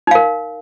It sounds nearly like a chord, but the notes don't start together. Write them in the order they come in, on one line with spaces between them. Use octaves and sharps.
D#4 F5 A#4